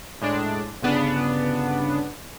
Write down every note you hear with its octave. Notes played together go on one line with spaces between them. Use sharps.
A2 G#3 D4
G1 C#3 B3 D4